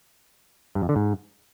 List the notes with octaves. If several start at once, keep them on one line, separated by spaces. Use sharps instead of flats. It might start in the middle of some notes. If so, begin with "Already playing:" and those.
G2
F2
D3
G#2